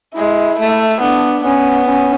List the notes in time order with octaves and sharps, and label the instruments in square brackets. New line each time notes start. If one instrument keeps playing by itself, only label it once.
[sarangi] G#3 [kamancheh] E4
[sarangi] A3
[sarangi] B3 [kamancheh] D4
[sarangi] B3 [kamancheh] C#4
[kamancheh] C#4